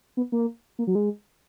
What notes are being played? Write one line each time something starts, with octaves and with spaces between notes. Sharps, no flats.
B3
A#3
A#3
F#3
G#3